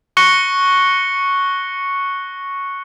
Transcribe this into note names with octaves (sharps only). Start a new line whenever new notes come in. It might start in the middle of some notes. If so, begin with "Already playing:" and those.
C#6 F#6 A#6 C#7 G7